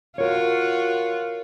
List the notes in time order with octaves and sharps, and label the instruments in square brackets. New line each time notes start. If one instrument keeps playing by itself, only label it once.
[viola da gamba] F4 F#4 [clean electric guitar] A#4 C#5